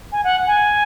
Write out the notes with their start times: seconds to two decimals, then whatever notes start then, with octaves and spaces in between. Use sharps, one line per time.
0.12 G#5
0.24 F#5
0.47 G#5